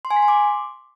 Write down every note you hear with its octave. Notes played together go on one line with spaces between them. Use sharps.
C6
G#5
B6
C6
D6